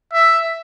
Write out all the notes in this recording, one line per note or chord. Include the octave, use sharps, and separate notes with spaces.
E5